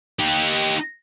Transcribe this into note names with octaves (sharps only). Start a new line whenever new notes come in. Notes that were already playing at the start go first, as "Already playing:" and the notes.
D#4 G4